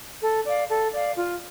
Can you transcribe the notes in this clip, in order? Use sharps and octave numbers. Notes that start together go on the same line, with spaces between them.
A4
D5 F5
A4
D5 F5
F4